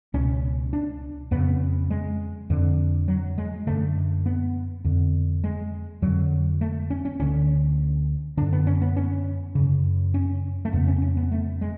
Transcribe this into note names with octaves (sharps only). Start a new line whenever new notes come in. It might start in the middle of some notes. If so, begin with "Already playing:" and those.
C#2 B2 C#4
D4
F2 C#3 B3
G#3
F2 D3
F#3
G#3
F#2 D3 A3
B3
F2 D3
G#3
F2 D3 F#3
A3
C#4
C#4
D2 D3 C#4
F#2 D3 D4
B3
C#4
B3
C#4
F#2 C#3
C#4
A3
F2 C#3 B3
C#4
C#4
B3
A3
G#3